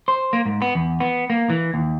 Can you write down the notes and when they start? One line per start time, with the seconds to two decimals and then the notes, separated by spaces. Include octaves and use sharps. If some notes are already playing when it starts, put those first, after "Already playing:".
0.08 C5
0.33 A#3
0.46 G#2
0.62 B3
0.75 E2
1.00 B3
1.30 A#3
1.50 E3
1.74 D#2